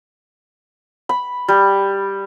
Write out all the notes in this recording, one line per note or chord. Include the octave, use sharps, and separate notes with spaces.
B5
G3